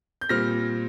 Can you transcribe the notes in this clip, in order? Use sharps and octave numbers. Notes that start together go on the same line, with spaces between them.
G6
A#2 G3 C4 F6 A#6